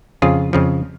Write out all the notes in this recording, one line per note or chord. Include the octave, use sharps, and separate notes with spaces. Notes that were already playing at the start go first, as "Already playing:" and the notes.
F2 C#3 F3 F4 G#4
F2 C#3 F3